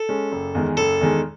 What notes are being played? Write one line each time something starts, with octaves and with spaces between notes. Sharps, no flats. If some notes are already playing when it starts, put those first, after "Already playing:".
Already playing: A4
G#3 C#4
F#1
E2 D#3 G#3
F#1 A4
E2 D#3 G#3